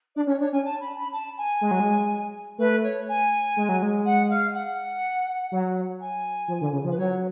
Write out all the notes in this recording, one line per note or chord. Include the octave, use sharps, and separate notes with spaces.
D4 D5
C#4 C#5
D4 C#5
C#4 G#5
A5
B5
B5
A5
G#5
G#3
F#3
G#3
A3 B4
C#5
G#5
G#3
F#3
G#3
F#5
F5
F#5
F#3
G#5
F3
D3
C#3
F3
B4
F#3 C#5